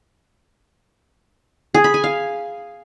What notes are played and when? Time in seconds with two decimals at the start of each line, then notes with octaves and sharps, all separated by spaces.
1.74 G#4
1.84 B5
1.94 G#5
2.04 F5